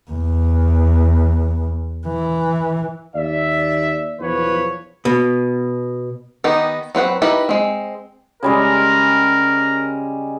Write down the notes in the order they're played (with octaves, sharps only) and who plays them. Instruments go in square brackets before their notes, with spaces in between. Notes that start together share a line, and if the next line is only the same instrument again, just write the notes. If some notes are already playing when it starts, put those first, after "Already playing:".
[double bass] E2
E3
[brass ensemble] D#2 D5 E5
B1 E2 F3 B3 B4 C#5
[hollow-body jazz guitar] B2
[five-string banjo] D#3 B3 D#4 G4
F#3 C4 B4 F#5
D#4 E4 G4 A#4 B4
G#3 C4
[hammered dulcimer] C#3 G3 G#3 [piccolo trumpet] A#4